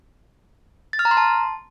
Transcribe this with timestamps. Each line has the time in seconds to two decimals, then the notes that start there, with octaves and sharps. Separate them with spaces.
0.93 A6
0.99 F6
1.05 A#5
1.11 C6
1.17 A5